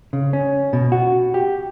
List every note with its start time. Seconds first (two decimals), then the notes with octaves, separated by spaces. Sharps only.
0.13 C#3
0.33 C#4
0.73 B2
0.92 F#4
1.34 G4